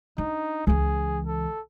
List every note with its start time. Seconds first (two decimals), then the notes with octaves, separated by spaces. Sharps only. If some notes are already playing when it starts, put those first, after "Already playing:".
0.18 D4 D#4
0.67 C#2 E3 G#4
1.26 A4